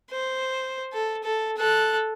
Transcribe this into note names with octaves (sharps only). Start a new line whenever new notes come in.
C5
A4
A4
A4 F#6